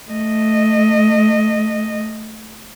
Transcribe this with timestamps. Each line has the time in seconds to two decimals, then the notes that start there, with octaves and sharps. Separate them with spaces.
0.11 A3 D#5